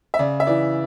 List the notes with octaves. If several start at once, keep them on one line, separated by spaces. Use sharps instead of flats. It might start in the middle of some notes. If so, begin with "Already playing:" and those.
E5
C#3 D5
E5
E3 D5